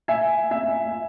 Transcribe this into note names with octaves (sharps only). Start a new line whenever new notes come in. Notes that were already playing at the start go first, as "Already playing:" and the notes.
E5 G#5
E5 G#5